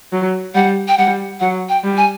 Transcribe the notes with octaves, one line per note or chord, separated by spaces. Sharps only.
F#3
G3 F#5
G5
G3 F#5
F#3 F#5
G5
G3
G#5